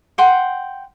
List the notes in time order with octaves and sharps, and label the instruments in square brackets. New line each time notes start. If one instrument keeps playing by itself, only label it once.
[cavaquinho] F#5 G5 C6